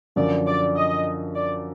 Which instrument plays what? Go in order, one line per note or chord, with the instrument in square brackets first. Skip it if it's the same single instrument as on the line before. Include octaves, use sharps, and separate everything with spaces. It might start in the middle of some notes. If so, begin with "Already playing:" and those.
[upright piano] F#2 D3 F3 [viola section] D5
[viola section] D5
D#5
D5